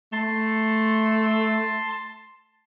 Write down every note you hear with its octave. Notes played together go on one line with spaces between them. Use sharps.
A3 A5 C6